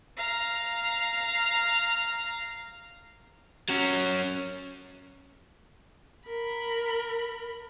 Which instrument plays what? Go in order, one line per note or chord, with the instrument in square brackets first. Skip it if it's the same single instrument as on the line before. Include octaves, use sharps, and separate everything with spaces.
[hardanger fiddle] F5 A#5
[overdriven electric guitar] F#3 C#4
[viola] A#4 B5